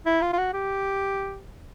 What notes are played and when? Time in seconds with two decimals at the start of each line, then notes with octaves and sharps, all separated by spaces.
0.06 E4
0.22 F4
0.33 F4
0.38 F#4
0.54 G4